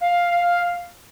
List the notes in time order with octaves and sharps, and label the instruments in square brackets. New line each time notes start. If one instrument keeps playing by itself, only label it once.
[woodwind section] F5